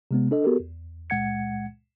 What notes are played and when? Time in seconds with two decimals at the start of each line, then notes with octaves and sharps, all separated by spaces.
0.11 C3 G#3 B3
0.31 D4 A4 D#5
0.44 B3 F#4 G4 A4 A#4
0.60 E2
1.10 C#2 A#2 G#3 F#5 G#6 C#7